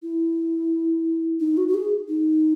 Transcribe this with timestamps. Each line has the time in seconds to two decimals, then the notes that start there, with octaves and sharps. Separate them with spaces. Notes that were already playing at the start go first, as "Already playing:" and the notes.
0.03 E4
1.40 D#4
1.57 F#4
1.68 F#4
1.74 G#4
2.08 D#4